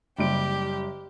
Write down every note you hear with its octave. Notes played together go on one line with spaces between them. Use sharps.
F#1 G3 G4 D7